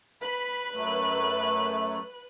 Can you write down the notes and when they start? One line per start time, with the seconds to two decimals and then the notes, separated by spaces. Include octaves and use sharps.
0.21 B4 B5
0.74 F#2 F#3 A3